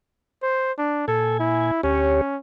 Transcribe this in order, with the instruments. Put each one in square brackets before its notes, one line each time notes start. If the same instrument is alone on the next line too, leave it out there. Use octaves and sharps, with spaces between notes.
[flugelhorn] C5
D4
[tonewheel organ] A#2 G#5 [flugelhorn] A4
[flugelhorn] E4
[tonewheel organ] D2 G4 C#5 [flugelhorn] C#4